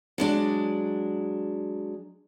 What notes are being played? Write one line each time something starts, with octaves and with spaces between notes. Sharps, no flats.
F#3 G#3 D4